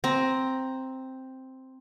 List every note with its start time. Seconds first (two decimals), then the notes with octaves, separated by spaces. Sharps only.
0.04 C4 A#5